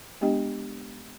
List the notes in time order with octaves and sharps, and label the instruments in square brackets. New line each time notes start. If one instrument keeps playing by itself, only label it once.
[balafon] G#3 B3 D4 G4 D#5 G5